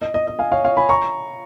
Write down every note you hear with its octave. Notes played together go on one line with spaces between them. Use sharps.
D#5
D#5
D#5
F5 G#5
C#5 F5
C#5 F5
G#5 B5
A#5 C#6